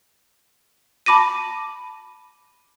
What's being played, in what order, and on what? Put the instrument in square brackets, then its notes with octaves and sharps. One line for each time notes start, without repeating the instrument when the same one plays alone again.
[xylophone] A5 B5 D6 A#6 D#7